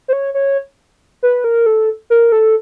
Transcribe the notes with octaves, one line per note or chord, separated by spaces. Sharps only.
C5
C#5
C#5
B4
A#4
A4
A#4
A4